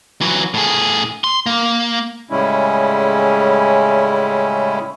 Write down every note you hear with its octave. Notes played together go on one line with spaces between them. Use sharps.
E3 F#3
A2 G#4
C6
A#3
A2 C#3 G3 G#3 C#4 E4